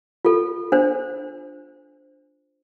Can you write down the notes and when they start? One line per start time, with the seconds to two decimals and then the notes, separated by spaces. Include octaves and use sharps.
0.25 F4 A4
0.72 D4 C5